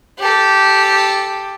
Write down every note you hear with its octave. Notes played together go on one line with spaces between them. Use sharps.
G4 A4